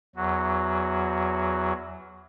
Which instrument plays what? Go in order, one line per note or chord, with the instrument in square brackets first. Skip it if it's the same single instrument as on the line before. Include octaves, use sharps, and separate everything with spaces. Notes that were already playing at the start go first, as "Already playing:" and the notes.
[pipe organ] E2 F#3 F#4